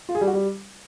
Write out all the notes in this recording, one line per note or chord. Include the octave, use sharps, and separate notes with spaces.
F4
G#4
G3
F#4
G3